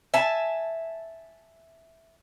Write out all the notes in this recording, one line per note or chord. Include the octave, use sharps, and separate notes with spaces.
E5 G#5 A5